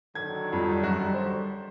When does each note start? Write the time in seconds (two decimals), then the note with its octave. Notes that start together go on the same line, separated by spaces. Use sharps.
0.15 D3 D#3 F#3 G#6
0.52 F2 G3
0.83 F#2 F#4
1.14 C5